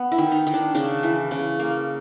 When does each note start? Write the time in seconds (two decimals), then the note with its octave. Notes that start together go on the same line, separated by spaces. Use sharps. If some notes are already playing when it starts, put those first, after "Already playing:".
Already playing: B3
0.12 E4
0.18 D#3
0.32 D#4
0.47 D#3
0.54 D4
0.74 C#3 D4
1.03 E3
1.31 C#3
1.59 A#3